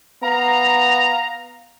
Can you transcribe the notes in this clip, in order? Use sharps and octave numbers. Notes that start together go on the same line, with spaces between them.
B3 F5 A#5